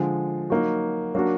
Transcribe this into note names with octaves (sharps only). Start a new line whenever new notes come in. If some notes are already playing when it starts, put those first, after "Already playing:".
Already playing: D3 F3 G#3
F#3 A#3 D#4 F#4
F#3 A#3 D4 F#4